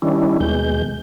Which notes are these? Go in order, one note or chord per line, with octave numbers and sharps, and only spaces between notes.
D#3 G3 C#4 D4 E4
D#2 B2 G#3 G6